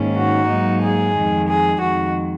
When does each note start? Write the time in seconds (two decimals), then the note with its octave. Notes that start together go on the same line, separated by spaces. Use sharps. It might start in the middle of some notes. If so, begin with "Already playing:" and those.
Already playing: G#2 D#3 A#3 C#4
0.15 F#4
0.49 G#2 F#3 A#3 D#4
0.82 G#4
1.14 F2 D#3 G#3
1.47 G#4
1.79 F2 D#3 G#3 F#4